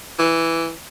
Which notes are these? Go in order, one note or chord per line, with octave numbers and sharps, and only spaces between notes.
E3